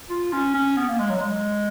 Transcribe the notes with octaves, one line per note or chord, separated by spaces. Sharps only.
F4
C#4
C#4
B3
A#3
G#3
F#3
G#3